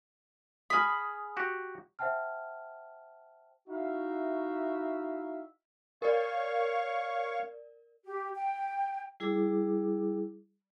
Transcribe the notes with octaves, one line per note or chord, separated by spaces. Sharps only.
G#4 B5 D#6 F6
F#4 G4
C5 E5 F#5 G5 A5 F6
D#4 E4 F#4 E5 F5
A#4 C#5 D5 F5 C#6
G4
G5
G3 E4 G#4 D6